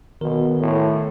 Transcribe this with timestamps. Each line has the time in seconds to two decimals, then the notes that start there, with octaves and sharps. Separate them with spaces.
0.21 B2 D#3 A#4
0.60 A2